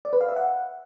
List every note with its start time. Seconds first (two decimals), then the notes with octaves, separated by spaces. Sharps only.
0.05 D5
0.13 B4
0.21 F5
0.29 E5
0.36 F#5